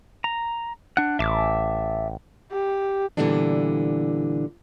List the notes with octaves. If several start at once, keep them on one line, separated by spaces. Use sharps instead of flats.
A#5
D4 F#5
A1 E5 A5 D6
G4
A#2 D3 E3 G3 B3 D4